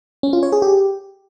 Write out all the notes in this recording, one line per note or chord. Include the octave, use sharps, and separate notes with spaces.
C#4
F4
C#5
G#4
G4